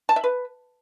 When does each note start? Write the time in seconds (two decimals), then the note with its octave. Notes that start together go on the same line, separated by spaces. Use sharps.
0.09 A5
0.16 E5
0.24 B4